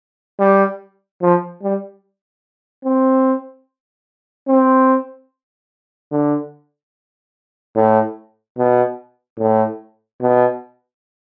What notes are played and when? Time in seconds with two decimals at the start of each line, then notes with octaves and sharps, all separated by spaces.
0.39 G3
1.22 F3
1.63 G3
2.84 C4
4.48 C4
6.12 D3
7.75 A2
8.58 B2
9.39 A2
10.21 B2